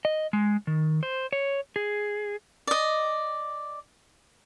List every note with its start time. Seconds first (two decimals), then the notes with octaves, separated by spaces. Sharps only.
0.05 D#5
0.33 G#3
0.67 D#3
1.03 C5
1.33 C#5
1.76 G#4
2.67 D5 D#5